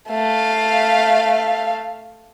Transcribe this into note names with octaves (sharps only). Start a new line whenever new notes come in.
A3 F5